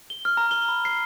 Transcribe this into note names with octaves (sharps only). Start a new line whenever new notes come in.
G7
F6
A#5
G7
B5
C7